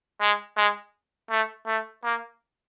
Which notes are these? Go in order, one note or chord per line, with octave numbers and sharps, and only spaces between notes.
G#3
G#3
A3
A3
A#3